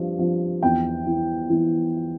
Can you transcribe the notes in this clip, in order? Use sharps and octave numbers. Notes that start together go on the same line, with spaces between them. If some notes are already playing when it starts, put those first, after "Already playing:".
Already playing: G2 F3
F3
E2 G5
E3
E3